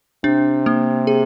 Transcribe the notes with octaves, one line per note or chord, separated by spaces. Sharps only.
C3 D4
A#3
G#4